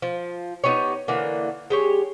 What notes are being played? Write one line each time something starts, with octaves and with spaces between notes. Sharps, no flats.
F3
B3 D#4 G4 C#5
D3 E3 A#3
G#3 G4 C#5